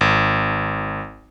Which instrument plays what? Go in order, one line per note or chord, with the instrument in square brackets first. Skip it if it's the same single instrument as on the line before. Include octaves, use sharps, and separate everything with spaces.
[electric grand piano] G#1